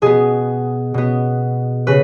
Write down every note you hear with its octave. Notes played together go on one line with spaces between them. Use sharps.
B2 B3 G#4
B2 B3
C#3 B4